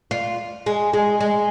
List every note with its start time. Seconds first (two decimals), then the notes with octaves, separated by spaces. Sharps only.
0.11 F4
0.66 G#3
0.93 G#3
1.20 G#3